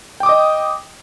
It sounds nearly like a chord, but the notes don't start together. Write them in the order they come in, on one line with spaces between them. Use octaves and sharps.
G5 D6 D#6 D#5